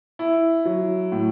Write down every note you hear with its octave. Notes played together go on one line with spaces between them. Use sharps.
E4
F#3
A2